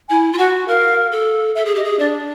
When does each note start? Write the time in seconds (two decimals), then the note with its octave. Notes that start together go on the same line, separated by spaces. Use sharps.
0.09 E4 G#5
0.33 F4
0.38 F#4 F#5
0.68 A#4 F5
1.12 A4
1.55 A4 E5
1.65 G#4
1.75 G4 D#5
1.84 G#4
1.99 D4 D5